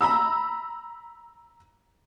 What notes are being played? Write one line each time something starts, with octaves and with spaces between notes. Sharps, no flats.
A#5 B5 E6